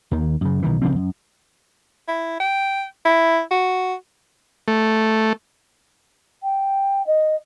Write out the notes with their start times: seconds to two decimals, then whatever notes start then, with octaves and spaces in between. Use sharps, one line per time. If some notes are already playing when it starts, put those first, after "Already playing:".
0.11 D#2 D#3
0.41 F#2 C#3
0.62 B1 D#3 E3
0.82 C#2 C#3 F3 C4
0.96 F#2
2.08 E4
2.40 G5
3.05 E4
3.51 F#4
4.68 A3
6.43 G5
7.06 D#5